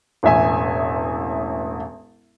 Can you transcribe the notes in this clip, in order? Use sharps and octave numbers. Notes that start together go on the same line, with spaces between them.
E1 A1 E5 G#5